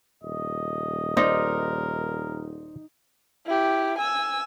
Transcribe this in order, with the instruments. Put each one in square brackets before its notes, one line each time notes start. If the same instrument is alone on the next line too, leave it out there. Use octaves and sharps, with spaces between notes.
[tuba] D#1 [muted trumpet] D#5
[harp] D#4 [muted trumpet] A#4 [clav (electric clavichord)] C5 D5 D#5
[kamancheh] E4 G4
G#5 E6